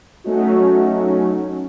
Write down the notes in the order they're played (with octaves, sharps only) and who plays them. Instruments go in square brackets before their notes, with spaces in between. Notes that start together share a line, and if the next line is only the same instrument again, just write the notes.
[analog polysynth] F#3 A3 C#4 D#4 F#4